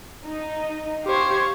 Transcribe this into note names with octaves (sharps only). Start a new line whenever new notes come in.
D#4
G4 C5 F5 C#6 G#6